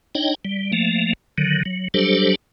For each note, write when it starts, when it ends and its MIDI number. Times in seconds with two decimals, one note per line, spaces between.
0.15 0.35 62
0.15 0.35 63
0.15 0.35 73
0.15 0.35 75
0.15 0.35 79
0.45 0.72 55
0.73 1.13 53
0.73 1.13 57
0.73 1.13 58
1.38 1.63 50
1.38 1.63 51
1.38 1.63 54
1.66 1.88 54
1.94 2.35 54
1.94 2.35 55
1.94 2.35 62
1.94 2.35 67
1.94 2.35 69
1.94 2.35 72